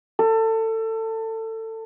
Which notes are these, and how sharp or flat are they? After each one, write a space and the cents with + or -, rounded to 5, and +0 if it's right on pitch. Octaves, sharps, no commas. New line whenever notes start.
A4 +25